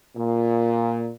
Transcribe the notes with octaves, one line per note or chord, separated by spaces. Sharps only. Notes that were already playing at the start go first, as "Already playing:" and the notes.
A#2